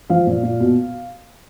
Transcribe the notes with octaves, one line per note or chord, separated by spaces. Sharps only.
F3 F5
A#2
A#2
B2